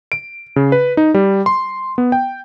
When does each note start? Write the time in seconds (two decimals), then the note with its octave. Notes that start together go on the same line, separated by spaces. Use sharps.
0.12 D7
0.56 C#3
0.72 B4
0.97 D#4
1.14 G3
1.46 C6
1.98 B3
2.12 G5